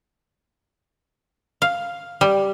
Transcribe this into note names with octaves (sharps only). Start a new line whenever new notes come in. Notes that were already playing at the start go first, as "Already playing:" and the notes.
F5
G3